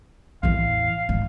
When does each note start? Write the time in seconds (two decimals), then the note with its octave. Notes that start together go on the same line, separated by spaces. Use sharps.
0.43 A1 E2 F5
1.09 G#2